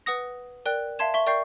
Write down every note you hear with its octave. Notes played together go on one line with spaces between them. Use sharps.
B4 F#5 D#6 A#6
A#4 D5 G5 F#6
E5 F5 A5 C6 G#6 E7
E5 C#6 G7
A#4 D5 G5 C#6 G6 C7